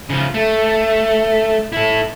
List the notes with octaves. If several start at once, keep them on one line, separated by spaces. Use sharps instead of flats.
C#3 F3
A3
E4 A4